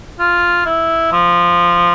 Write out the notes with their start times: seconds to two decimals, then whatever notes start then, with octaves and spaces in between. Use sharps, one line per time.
0.19 F4
0.65 E4
1.12 F3